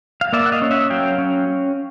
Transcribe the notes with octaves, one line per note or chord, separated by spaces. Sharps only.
F5
A#3 D5 E5
F#5
D#5 F5
C#4
E5 F#5
F#3 F5 G5
C#4